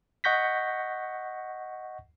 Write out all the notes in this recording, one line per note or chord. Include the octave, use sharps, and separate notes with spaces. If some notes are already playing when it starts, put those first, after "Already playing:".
D#5 F#5 C#6 G6 A#6 B6